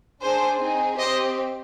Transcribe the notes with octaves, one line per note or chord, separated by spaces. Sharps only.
D4 G#4 C5
C4 D#4 G#4
C4 G4 C5 D#5